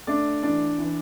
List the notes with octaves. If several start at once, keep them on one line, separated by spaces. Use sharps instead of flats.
A3 D4 D5
E3 D4 D5
E3